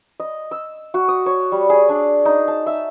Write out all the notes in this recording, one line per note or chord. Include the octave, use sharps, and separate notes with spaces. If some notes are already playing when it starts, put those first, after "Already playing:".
D#5
E6
F#4
D#6
C#5
G3
G#4
D4
D#4
A5
E5